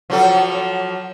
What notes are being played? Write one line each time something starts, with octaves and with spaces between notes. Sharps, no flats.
F3 F#3 A4